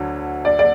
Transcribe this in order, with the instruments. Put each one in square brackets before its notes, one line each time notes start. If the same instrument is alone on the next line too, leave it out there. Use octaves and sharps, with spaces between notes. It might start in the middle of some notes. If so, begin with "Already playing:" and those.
Already playing: [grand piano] D2 D3 F#3
[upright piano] D5
D5